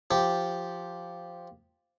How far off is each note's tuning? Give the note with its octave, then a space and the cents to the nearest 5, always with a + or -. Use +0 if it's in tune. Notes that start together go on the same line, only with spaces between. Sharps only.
F3 +0 G4 +0